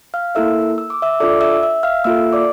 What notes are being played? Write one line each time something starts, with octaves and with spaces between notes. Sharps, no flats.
F5 F6
A#3 E4 A4 E5 E6
E6
D6
E5 E6
D4 F4 A4 D5 D6
E5 E6
E5 E6
F5 F6
A#3 F4 A4 E5 E6
D5 D6